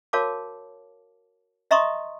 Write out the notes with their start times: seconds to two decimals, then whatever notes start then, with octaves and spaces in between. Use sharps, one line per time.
0.13 F#4 A#4 C#5 F5 A5 D6
1.71 D#5 E5 A#5 C6 C#6 D#6